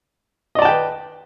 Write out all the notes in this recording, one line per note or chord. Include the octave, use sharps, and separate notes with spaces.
B4 D5 D#5 G5 A5